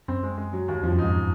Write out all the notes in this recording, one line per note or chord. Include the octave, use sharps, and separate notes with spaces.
F#2 C4
G#3
G#3
F#3
D#2
F2 F3
F#2
G#2 D#4